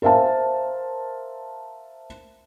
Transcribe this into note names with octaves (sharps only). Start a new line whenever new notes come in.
A#4 C5 E5 F5 A5